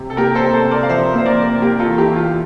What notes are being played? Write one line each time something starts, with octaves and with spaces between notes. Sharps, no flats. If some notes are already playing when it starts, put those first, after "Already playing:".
Already playing: C3
A4
A#3 G4 A#4
A4 C5
C3
A4 C5
C3
A#4 D5
F5
F3 C5 E5
A#3 C5
A#4 D5
C3
A#3 G4 A#4
F4 A4
E2
E4 G4
E2
F4